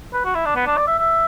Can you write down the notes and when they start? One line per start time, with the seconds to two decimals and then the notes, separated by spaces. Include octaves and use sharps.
0.13 B4
0.25 F#4
0.35 E4
0.45 D4
0.56 B3
0.66 D4
0.77 D5
0.87 E5
0.98 E5